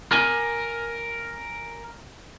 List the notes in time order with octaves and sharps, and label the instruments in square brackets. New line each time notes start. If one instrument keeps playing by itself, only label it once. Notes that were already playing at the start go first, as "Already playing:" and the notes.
[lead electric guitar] A#4 G#5